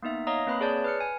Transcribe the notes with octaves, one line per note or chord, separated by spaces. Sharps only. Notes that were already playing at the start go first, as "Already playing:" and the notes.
A#3 B3 D#4 E5
C#5 D#5 F5 A#5 D#6
A#3 C4 B4 B5
G#4 C#5 D5 A5 G6
B4 F6 C#7
G#5